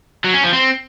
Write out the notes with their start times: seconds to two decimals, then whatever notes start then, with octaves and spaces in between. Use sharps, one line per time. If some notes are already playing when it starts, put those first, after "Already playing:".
0.24 F#3
0.34 C#4
0.43 F3
0.53 C4